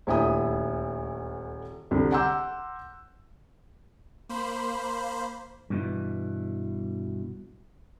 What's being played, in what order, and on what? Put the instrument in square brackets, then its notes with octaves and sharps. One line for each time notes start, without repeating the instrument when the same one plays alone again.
[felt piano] D#1 D2 E4 G5 A#5 D#6
C2 D3
F#5 A#5 C6 D6 E6 G6
[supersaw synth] A#3 C5 B5
[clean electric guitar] G2 B2 E3